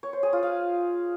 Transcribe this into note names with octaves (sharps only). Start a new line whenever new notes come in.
C#5
C5
G#4
F4
F5